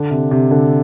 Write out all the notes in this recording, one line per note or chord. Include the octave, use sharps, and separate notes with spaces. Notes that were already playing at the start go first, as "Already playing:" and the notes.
Already playing: D3
C3
C3
D3